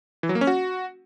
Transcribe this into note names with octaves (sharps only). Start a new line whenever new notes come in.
E3
F#3
A#3
C#4
F#4